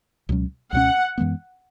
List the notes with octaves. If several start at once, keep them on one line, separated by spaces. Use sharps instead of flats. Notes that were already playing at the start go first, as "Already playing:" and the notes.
C#2 B2 F#3 C#4
C#2 B2 F#3 C#4 F#5
F#2 E3 G#3 B3